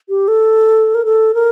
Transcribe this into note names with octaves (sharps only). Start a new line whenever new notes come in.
G4
A4
A#4
A4
A#4